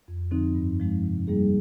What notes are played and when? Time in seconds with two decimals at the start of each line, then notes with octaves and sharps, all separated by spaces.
0.08 F2
0.31 D3 F3 C4 D#4
0.55 G2
0.79 F3 G#3 D#4
1.03 C3
1.27 G3 A#3 D#4 G#4